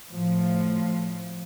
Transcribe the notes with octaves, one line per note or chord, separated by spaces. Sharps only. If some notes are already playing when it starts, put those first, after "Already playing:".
A2 F3